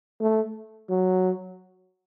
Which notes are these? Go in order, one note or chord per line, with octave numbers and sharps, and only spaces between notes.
A3
F#3